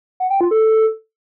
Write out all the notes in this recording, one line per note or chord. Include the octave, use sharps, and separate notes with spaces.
F#5
G5
F4
A4